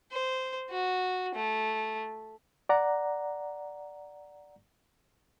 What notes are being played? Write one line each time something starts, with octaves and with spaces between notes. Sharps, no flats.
C5
F#4
A3
D5 F#5 A#5